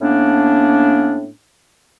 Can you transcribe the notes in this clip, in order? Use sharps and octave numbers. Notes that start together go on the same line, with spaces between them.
A2 A#3 B3 C#4 D4